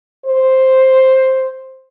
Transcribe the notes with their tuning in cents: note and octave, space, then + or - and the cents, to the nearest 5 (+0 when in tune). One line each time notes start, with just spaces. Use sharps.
C5 +5